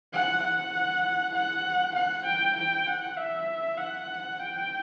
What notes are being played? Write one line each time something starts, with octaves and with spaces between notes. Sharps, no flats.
F#5
F#5
F#5
F#5
G5
G5
F#5
E5
F#5
G5